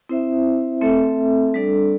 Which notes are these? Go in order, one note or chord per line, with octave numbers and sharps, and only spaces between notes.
C4 E4 C5 E5
A3 C4 A4 E5
G3 D4 A4 D5